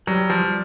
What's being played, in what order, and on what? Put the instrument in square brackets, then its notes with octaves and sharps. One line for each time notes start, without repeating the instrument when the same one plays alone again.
[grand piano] F#3 [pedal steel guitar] G3
[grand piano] F3